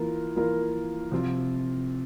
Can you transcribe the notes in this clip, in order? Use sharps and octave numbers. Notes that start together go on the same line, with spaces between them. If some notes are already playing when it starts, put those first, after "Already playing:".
Already playing: E3 A#3 F4 A#4
E3 A#3 F4 A#4
C3 F3 C4 F4